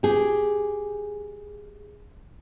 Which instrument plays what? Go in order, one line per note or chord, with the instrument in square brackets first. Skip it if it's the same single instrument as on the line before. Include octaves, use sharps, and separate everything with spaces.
[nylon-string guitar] G4 G#4